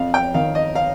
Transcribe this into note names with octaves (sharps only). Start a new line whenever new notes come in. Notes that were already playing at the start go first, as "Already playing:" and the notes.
Already playing: F2 F5
G5
D#3 F5
D#5
F5